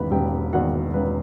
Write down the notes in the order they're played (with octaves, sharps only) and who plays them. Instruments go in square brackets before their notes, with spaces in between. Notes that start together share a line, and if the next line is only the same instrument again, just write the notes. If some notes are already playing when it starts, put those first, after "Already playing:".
Already playing: [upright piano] E1 E2 D#3 B4 B5
E1 G4 G5
E2 D#3 F#4 F#5
E1 B4